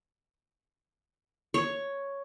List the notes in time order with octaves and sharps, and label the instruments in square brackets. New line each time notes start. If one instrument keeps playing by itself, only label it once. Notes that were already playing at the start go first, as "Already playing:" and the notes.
[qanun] C#5